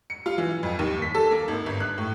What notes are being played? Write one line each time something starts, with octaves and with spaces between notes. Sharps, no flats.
C#7
F4
E3
F2
D#2
B6
A4
A#3
G#1
G1
F#6
A2